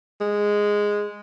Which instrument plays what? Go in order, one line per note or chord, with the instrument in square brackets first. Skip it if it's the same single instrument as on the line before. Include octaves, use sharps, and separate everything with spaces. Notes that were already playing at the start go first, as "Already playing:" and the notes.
[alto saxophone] G#3